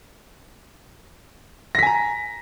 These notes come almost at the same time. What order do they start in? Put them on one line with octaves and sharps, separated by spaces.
A#6 B6 G#5 A#5